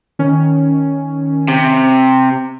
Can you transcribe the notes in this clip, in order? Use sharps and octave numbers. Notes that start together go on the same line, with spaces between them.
D#3 C#4
C3